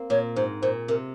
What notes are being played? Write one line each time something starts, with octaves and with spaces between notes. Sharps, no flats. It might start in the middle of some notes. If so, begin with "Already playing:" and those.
Already playing: A#3 C4
A#2 C#5
G#2 C5
A#2 C5
C3 A#4